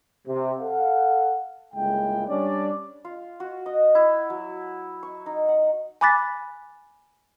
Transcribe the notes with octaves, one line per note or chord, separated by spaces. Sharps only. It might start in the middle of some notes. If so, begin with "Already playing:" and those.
C3
A4 F5 F#5
G1 C#2 G#3 A#3 E4 G5
G3 C#4 D4 D5
F4
F#4
D#5
E4
F#3
C#6
D#4
F#5
G#5 B5 D6 F#6 A6 B6